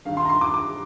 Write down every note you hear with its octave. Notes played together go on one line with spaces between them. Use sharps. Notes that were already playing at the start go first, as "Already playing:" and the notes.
G2 D#3 F5
C6
A#5
C6
D6
D6